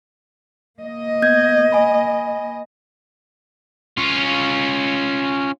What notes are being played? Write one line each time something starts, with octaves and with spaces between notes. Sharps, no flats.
A#3 D#5
B3 G6 G#6
G#5 B5
C#4 F4